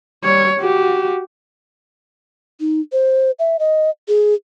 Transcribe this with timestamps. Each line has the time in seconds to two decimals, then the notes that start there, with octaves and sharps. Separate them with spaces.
0.24 G3 C#5
0.60 F#4 G4
2.60 D#4
2.92 C5
3.39 E5
3.59 D#5
4.08 G#4